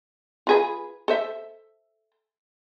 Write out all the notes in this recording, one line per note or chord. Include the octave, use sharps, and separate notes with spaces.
F4 G#4 B4
A4 C5 E5